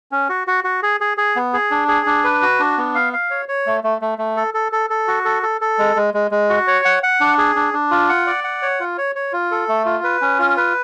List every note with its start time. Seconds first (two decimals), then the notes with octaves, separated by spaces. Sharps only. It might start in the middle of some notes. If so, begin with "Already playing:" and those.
0.12 C#4
0.29 F#4
0.47 F#4
0.64 F#4
0.83 G#4
1.01 G#4
1.17 G#4
1.36 B3
1.53 G#4
1.71 D4
1.88 G#4
2.06 D4
2.24 B4
2.42 F#4
2.60 D4
2.78 B3
2.95 F5
3.13 F5
3.30 C#5
3.49 C#5
3.66 A3
3.84 A3
4.02 A3
4.18 A3
4.37 A4
4.54 A4
4.72 A4
4.90 A4
5.08 F#4
5.25 A4
5.43 A4
5.61 A4
5.79 G#3
5.96 G#3
6.14 G#3
6.31 G#3
6.50 F#4
6.68 C#5
6.85 F#5
7.03 F#5
7.21 D4
7.38 G#4
7.56 D4
7.74 D4
7.91 F4
8.09 F#5
8.27 D5
8.44 F#5
8.62 C#5
8.80 F4
8.98 C#5
9.16 C#5
9.33 F4
9.51 A4
9.69 A3
9.86 F4
10.04 B4
10.22 C#4
10.39 F4
10.57 B4